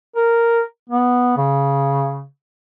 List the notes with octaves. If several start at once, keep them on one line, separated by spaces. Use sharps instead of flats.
A#4
B3
C#3